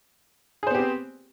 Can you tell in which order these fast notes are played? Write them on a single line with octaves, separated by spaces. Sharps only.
G#4 C5 B3 G4 C4